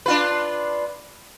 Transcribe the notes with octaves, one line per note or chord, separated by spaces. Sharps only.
D4 F4 B4